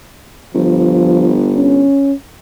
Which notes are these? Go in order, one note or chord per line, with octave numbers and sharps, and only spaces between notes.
G1 F3
C#4